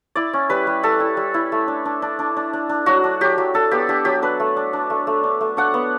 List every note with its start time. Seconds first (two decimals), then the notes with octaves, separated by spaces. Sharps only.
0.15 E4 D5
0.33 C#4
0.49 G3 B4
0.67 G3
0.83 G3 A4
1.00 E4
1.17 G3
1.34 E4
1.52 A3
1.68 D4
1.85 D4
2.02 D4
2.19 D4
2.37 D4
2.53 D4
2.69 D4
2.86 F#3 F#4
3.04 D4
3.21 F#3 G4
3.38 F#3
3.54 D4 A4
3.71 B3 G4
3.89 D4 G4
4.05 F#3 G4
4.22 D4 B4
4.40 A3
4.57 D4
4.73 D4
4.90 A3
5.07 A3
5.24 D4
5.41 A3
5.57 D4 F#5
5.74 B3